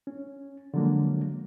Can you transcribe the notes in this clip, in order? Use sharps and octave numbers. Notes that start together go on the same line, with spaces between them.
C#4
D3 F3 F#3 G#3 A#3